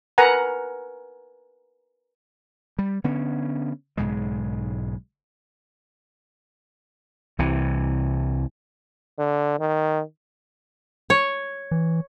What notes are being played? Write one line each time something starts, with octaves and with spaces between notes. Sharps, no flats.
A#4 B4 F#5 G#5 A#5
G3
D3 B3 C#4
B1 G#2 C#3 G#3
C2 C3 E3
D3
D#3
C#5
E3